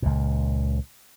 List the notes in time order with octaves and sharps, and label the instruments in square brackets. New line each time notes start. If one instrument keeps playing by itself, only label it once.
[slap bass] C#2 A#2